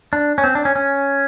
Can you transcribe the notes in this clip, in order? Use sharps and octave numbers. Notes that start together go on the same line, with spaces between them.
D4
C#4
C4
D4
C#4
C#4